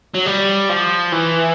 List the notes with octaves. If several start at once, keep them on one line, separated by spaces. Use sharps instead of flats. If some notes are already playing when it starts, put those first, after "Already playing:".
F#3
G3
F3
E3